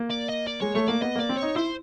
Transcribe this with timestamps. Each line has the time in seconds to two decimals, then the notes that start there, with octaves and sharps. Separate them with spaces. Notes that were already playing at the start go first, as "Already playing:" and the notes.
Already playing: A#3
0.11 D5
0.29 D#5
0.47 D5
0.61 G#3 C#5
0.75 A3 C#5
0.88 A#3 D5
1.02 B3 D#5
1.15 A#3 D5
1.29 C4
1.38 D#4 C#5
1.56 E4 C5